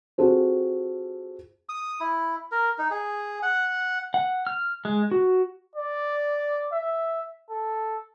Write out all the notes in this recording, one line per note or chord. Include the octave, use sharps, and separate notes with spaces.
C4 F4 F#4 G#4 A4 C5
D#6
E4
A#4
D#4
G#4
F#5
F#5
F6
G#3
F#4
D5
E5
A4